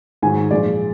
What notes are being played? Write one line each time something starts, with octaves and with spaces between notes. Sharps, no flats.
G#2 D#3 F#3 G#5
A#2 F3 G#3 D5